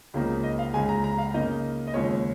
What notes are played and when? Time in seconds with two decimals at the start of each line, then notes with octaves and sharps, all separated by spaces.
0.14 C#2 C#3 F3 A#3 D#4
0.43 D#5
0.59 F5
0.74 C#2 C#3 G#3 G#5
0.89 A#5
1.04 A#5
1.18 F5
1.34 C#3 A#3 D#4 D#5
1.87 D#5
1.94 D#2 C#3 F3 G#3 C#5